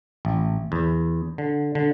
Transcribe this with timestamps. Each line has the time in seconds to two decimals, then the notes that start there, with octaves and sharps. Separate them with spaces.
0.25 A1
0.72 E2
1.38 D3
1.75 D3